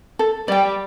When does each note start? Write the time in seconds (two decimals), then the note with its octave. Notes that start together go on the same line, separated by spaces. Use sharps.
0.19 A4
0.48 G3 D5 G5